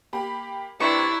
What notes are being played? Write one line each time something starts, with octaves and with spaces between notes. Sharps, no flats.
A#3 G4 B5
C3 D4 E4 B4 D5 A#5 C#6